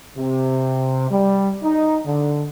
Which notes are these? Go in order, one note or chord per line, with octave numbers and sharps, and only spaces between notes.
C3
G3
D#4
D3